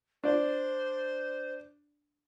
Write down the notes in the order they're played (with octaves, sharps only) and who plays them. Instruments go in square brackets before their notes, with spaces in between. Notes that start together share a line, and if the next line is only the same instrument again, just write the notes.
[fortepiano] D4 D5 [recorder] C5